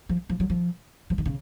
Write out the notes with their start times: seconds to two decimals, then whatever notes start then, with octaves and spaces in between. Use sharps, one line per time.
0.09 F3
0.29 F3
0.40 F#3
0.50 F3
1.10 F3
1.18 D#3
1.26 C#3